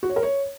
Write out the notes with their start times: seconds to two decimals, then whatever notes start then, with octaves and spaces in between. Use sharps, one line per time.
0.03 F#4
0.10 C#5
0.16 A#4
0.23 C#5